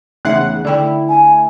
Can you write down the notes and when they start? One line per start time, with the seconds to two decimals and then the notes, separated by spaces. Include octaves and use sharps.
0.25 E2 C#3 A3 D#4 E5 F#5
0.65 D3 A3 E4 D5 G5
1.09 G#5